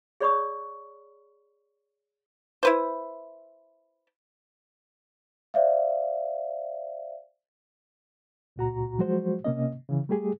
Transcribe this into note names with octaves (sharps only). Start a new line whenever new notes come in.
G#4 C#5 D5 B5 C#6 D#6
E4 B4 C5
C5 D5 E5 F5
C#2 A#2 F#4 A#5
F3 F#3 G#3 F#4 C5
C3 A#3 C#4 D#5
C#3 E3
G3 A3 G4 G#4